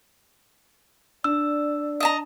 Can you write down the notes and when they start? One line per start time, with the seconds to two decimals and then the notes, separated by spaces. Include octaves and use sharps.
1.24 D4 D5 E6
2.00 D#5 A5 A#5